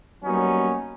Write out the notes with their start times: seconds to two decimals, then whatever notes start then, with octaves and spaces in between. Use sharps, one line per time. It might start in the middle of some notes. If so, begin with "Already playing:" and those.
0.24 F#3 G3 A#3 B3 C#4 D#4